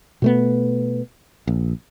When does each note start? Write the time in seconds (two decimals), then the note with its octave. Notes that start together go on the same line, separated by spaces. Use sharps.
0.22 B2 A3 B3
1.47 A#1